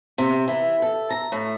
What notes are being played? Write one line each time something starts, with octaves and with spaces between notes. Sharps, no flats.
C3
E3
A4
A#5
A2